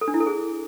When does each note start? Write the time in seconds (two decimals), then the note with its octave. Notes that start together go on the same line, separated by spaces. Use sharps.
0.01 A4
0.08 D4
0.14 E4
0.20 A4
0.26 G#4